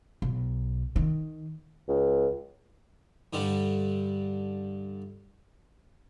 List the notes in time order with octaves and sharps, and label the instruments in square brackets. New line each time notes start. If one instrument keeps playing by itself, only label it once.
[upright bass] B1
D#3
[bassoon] C#2
[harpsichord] G2 D3 G3 A3